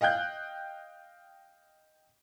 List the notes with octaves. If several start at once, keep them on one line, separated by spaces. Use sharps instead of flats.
D#5 F5 G5 F#6 G6